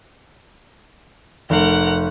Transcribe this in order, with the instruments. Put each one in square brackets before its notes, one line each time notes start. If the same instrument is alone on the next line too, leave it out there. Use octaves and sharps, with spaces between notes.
[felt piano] F1 [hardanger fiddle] A#4 F#5